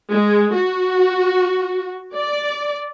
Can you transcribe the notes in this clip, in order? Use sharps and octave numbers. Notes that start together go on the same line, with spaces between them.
G#3
F#4
D5